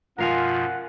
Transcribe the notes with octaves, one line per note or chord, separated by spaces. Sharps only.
F#2 B2 F3 F4 A#4 F5 F#5 G#5